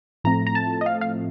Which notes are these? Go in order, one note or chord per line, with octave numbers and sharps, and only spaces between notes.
A2 F3 A3 C4 A#5
A#5
A5
D#5
F5
F5